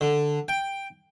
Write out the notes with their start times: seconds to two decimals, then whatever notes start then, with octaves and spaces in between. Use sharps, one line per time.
0.01 D3
0.48 G5